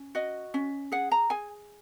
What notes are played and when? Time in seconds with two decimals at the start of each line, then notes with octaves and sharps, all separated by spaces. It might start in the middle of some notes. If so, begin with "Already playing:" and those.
Already playing: C#4
0.15 F#4 D#5
0.54 C#4
0.92 G#4 F#5
1.12 A#5
1.30 G#4 G#5